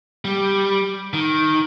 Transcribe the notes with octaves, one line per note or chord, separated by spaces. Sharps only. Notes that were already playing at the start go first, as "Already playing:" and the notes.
G3
D#3